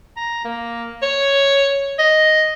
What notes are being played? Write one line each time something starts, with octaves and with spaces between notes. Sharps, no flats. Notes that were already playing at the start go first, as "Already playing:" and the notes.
A#5
A#3
C#5
D#5